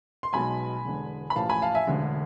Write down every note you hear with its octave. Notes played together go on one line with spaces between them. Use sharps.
C6
B1 B2 G#3 G#5 B5
E1 E2 D3 G#3
B5
A1 A2 F3 F5 A5
G#5 B5
F5 A5
E5 G#5
E1 D2 D3 G#3